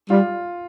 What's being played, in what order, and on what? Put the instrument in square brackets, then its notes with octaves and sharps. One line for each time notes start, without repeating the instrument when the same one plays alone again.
[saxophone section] G3 [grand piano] F4